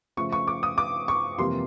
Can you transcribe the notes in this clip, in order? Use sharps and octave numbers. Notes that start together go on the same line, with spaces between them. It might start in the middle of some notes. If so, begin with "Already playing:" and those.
C#3 F3 A3 C#6
C#6
D6
D#6
D6
C#6
F2 C3 E3 G3 A#3 C6